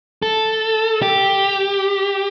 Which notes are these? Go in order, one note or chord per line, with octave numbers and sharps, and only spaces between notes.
A4
G4